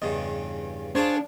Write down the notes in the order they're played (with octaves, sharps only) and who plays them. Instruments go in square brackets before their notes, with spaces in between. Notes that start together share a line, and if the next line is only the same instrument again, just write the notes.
[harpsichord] E2 G2 C#3 [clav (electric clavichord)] D#5
[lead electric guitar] D4 [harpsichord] F4 G#4 C#5 [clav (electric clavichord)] C5